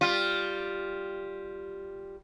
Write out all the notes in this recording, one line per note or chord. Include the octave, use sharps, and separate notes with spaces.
G3 F4